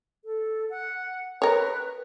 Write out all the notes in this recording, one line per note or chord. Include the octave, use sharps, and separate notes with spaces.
A4
F#5
A#4 B4 C#5